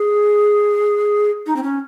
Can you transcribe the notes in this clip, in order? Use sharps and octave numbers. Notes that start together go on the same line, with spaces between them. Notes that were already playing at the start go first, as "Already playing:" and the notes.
Already playing: G#4
D#4
C4
C#4